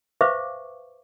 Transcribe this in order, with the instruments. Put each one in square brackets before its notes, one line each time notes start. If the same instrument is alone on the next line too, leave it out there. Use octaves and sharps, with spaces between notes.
[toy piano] B4 C5 E5 F5 C#6 D6